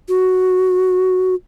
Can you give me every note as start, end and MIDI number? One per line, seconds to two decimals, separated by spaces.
0.09 1.35 66